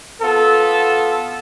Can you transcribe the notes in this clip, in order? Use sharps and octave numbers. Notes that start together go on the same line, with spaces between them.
B3 F4 A4